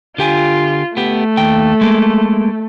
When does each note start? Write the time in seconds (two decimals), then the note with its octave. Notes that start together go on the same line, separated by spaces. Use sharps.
0.18 D3 F4 G4 G#5
0.97 A3 B3 G4
1.37 D#2 G5
1.81 G#3 A#3